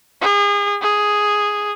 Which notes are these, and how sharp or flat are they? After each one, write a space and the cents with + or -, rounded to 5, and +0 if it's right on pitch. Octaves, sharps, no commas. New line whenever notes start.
G#4 -35
G#4 +0